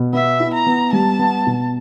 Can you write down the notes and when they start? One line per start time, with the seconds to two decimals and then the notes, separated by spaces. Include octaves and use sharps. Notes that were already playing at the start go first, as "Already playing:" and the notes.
Already playing: B2
0.13 B3 E5
0.40 E4
0.54 A#5
0.67 B3
0.93 G3 A5
1.19 B3
1.47 B2